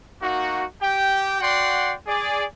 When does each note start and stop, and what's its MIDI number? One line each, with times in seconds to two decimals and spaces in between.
0.21 0.64 58
0.21 0.64 63
0.21 0.64 66
0.81 1.37 67
0.81 1.37 79
1.40 1.93 66
1.40 1.93 74
1.40 1.93 78
1.40 1.93 79
1.40 1.93 84
2.07 2.44 68
2.07 2.44 74